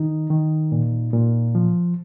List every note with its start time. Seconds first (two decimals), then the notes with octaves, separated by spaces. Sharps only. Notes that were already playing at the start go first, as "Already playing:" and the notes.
Already playing: D#3 D#4
0.30 D#3
0.72 A#2
1.13 A#2
1.55 F3